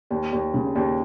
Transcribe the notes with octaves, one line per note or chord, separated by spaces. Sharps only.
D#2
D#2
C#3
D#2